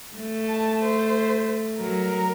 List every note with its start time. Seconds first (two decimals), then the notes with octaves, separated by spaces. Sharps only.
0.16 A3
0.49 A5
0.82 C5
1.79 F#3 A#4